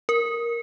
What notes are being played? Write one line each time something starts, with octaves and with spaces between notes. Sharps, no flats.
A#4